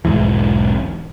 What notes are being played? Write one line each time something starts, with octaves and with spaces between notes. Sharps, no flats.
B1 E2 G#2 E3